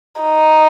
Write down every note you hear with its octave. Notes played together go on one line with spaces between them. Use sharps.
D#4